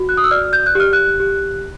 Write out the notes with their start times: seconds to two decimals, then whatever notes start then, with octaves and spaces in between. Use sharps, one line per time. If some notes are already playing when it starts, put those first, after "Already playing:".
Already playing: F#4
0.09 F#6
0.17 D#6
0.24 E6
0.31 D5 F6
0.53 G6
0.66 F#6
0.75 G4 F6
0.93 F#6
1.20 G4